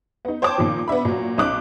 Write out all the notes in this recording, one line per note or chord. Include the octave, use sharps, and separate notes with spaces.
B3 D#4
C5 C#5 G5 A5 D6
A#2 D#3 F3
B3 D4 E5 B5
A#2 F#3
B1 C#4 D#4 D6 F#6